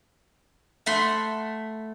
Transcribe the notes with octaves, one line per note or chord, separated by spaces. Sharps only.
A3 F#5 B5 C6